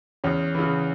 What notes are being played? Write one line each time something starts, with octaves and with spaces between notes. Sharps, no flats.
E2 C#4
C#3 E3